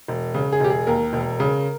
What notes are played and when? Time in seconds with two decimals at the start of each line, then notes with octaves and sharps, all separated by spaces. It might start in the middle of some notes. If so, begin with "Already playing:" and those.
0.08 E1
0.34 C#3
0.52 G#4
0.60 E1 G4
0.70 G#4
0.87 D#2 A#4
1.13 E1
1.40 C#3